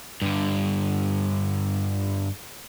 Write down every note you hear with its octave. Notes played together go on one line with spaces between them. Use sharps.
G2 D3